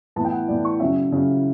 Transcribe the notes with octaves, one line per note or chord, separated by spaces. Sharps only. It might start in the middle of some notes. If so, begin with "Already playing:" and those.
A2 E3 B3 A5
G5
F#5
A2 E3 B3 D5
C#6
C#3 F#3 C#4 E5
C#3 F#3 C#4